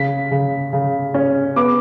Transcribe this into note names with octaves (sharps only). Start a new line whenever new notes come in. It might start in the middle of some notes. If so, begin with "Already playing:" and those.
Already playing: C#3 B6
C#3
C#3
C#4
B3 D6